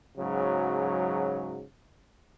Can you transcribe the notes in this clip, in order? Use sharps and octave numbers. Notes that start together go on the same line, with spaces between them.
G#2 C#3 F#3